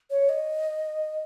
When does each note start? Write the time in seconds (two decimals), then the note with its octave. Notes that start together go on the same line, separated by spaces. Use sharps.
0.10 C#5
0.29 D#5